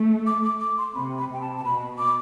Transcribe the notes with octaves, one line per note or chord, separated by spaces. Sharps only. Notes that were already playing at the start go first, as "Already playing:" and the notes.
Already playing: A3
D6
D6
D6
C6
C3 B5
B5
C3 G5
A5
A5
B2 B5
D6